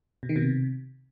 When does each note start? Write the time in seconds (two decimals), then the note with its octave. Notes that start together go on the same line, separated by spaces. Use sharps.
0.23 B2
0.29 D#3
0.36 B2
0.42 C3